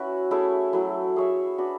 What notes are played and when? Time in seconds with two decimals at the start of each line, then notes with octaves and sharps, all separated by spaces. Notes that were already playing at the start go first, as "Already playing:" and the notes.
Already playing: C#4 E4 F#4 B4 E5
0.31 A3 C#4 E4 G#4
0.73 F#3 A3 E4
1.16 C#4 G#4 C#5 E5
1.58 D4 F#4 B4